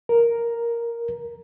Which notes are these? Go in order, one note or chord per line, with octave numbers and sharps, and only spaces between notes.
A#4